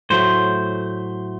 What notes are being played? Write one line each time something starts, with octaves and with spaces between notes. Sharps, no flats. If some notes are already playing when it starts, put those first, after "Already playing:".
A2 F#3 A3 C5